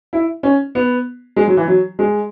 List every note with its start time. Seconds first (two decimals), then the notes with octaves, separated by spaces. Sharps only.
0.13 E4
0.43 C#4
0.75 B3
1.36 G#3
1.48 F#3
1.57 E3
1.68 F#3
1.99 G#3